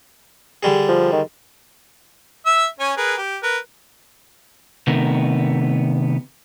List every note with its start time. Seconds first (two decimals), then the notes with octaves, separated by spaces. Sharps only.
0.63 D3 G3 G#4
0.89 F3
1.12 D#3
2.46 E5 E6
2.80 C#4 C#5 G#5
2.97 G#4 A#4 B4
3.18 G4
3.43 A#4 B4
4.87 C3 D#3 A3 B3 A#4